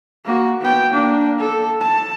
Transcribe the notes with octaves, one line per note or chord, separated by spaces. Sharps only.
A#3 F#4
B3 G5
A#3 D4
A4
A5